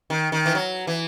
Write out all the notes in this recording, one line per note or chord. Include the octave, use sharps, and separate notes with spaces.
D#3
D#3
E3
F#3
E3